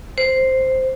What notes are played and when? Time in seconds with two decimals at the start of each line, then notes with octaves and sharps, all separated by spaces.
0.18 C5